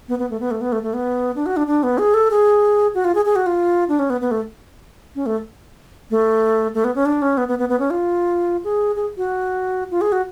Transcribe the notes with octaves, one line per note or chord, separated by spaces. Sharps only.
B3
B3
A3
B3
A3
B3
A3
A3
B3
D4
F#4
D4
D4
B3
G#4
A4
G#4
F#4
F4
G#4
G#4
F#4
F4
D4
C#4
B3
B3
A3
C#4
A3
A3
A3
B3
C#4
D4
C#4
B3
B3
B3
B3
C#4
F4
G#4
G#4
F#4
F4
G#4
F#4